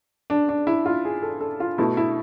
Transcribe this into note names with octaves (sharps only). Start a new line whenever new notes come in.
D4
D4
E4
F4
G#4
A4
A4
F4
B2 A3 E4
E4